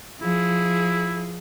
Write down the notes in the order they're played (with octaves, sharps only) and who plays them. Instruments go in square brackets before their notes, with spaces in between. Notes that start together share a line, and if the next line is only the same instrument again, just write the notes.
[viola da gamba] F3 G#4 [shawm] E4